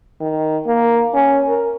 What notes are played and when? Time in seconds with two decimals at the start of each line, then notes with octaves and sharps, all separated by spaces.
0.21 D#3
0.67 A#3
1.14 C#4
1.48 A#4